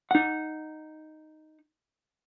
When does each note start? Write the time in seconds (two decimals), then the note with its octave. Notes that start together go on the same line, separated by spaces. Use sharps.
0.11 D#4 F#5